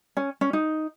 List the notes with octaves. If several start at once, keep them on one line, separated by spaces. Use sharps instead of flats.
C#4
C#4
D#4